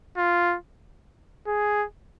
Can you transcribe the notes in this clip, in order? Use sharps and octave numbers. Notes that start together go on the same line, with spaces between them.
F4
G#4